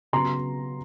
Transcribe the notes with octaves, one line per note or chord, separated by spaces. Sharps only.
C#3 F#3 B3 A#5 C6